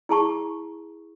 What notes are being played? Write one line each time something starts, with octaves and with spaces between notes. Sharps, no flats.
E4 G#4 A5 C#6